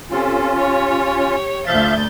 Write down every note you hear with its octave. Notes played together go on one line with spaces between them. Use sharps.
C3 C#4 F4 A4
G4 C#5
D2 F3 E5 F5 G6 A6